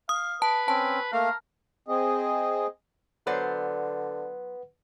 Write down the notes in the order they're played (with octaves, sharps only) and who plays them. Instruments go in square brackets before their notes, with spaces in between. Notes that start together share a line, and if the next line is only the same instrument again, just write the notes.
[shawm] F5 [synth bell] D#6
[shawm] B4 [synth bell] A5
[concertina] C4 C#4 [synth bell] A5
[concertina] A3 A#3 F5 [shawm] A#4
[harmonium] C4 G#4 D#5
[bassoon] D3 [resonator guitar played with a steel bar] F#3 C5 D5 [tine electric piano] B4 F#5